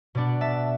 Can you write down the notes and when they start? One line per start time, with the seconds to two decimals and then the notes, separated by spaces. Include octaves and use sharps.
0.15 B2 B3 D4 D5 F#5
0.41 E5 A5